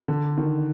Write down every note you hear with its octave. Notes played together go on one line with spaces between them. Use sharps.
D3
D#3